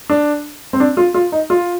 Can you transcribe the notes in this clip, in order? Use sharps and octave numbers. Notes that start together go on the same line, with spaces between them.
D4
C4
D4
F4
F4
D#4
F4